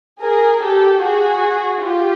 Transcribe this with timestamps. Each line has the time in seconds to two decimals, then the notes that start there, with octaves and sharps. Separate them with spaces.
0.21 G#4 A#4
0.61 G4 A4
1.01 F#4 G#4
1.81 F4 G4